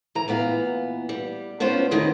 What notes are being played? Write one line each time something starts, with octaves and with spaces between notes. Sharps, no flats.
E3 A#5
A#2 E3 B3 F5
G3
B3 C#4 D4 F4 C5
E2 D#3 C#4 B4 D#5